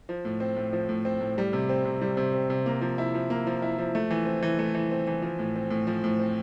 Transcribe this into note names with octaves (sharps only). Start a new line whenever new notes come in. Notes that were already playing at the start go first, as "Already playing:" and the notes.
F3
A2
C4
A2
F3
A2
C4
A2
G3
C3
C4
C3
G3
C3
C4
C3
A#3
F3
E4
F3
A#3
F3
E4
F3
A3
E3
C4
E3
A3
E3
C4
E3
F3
A2
C4
A2
F3
A2
C4